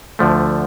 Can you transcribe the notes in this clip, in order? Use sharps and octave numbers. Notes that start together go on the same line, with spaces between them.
D2 D3 F3 A3